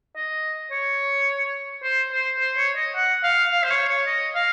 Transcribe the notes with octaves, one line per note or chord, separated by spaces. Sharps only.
D#5
C#5
C5
C5
C5
C#5
D#5
F#5
F5
F5
C5
C#5
C#5
D#5
F5